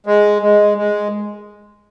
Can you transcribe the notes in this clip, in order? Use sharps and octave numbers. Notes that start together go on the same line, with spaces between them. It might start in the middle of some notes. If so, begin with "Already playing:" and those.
G#3
G#3
G#3